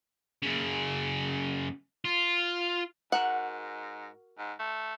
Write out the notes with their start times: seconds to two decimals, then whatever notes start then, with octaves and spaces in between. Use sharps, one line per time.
0.43 F#2 C#3
2.05 F4
3.12 G#2 F#4 A#4 F#5
4.39 G#2
4.59 A3